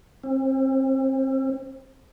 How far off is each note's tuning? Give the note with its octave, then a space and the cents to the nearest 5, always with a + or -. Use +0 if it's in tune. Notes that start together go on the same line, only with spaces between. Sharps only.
C4 +30